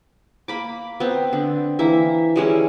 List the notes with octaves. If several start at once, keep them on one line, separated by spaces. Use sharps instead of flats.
A#3 B5 D6
B3 C4
D3
E3 A#3 E5
G3 G#3 C#4 E4